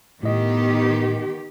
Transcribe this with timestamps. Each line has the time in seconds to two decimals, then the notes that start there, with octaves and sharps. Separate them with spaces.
0.23 A2 D#3 B3 G4 D#5